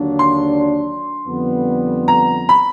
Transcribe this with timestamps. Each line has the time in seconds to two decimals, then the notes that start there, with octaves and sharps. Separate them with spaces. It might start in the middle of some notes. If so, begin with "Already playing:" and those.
Already playing: D#2 D3 F#3 A#3 D4
0.19 C6
1.27 F2 D3 G3 B3
2.08 A#5
2.49 B5